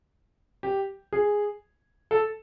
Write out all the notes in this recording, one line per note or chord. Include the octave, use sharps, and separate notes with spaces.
G4
G#4
A4